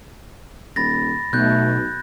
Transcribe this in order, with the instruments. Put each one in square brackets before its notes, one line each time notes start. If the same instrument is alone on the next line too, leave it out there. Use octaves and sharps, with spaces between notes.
[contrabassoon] D#1 [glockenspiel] B5 A6 A#6
[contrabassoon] B1 [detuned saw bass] B2 [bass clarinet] A3 [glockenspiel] F#6 G6